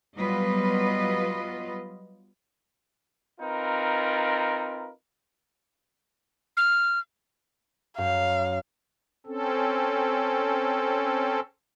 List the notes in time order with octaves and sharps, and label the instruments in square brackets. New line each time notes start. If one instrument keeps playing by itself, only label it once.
[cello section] F#3 G3 B3 F4 B4 D#5
[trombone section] C4 D#4 F4 A#4 B4
[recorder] F6
[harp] F#2 [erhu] F5
[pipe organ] C4 C#4 A4